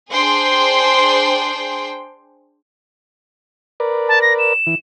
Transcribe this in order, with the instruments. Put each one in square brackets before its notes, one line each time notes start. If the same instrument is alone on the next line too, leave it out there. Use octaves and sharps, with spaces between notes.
[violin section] D4 G#4 C5 G5 C6
[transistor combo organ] A#4 B4 D5
[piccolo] A5
A#6
E7
[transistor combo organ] E3